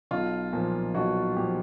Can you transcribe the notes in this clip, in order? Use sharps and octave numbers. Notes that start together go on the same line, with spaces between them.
B1 F4
A#2 F3
B1 F#4
A#2 F3 G4